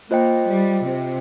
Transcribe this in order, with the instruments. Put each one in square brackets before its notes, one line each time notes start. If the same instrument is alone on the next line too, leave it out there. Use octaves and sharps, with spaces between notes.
[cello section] A#3 [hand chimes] F4 C5 D#5 G5
[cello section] G3
C3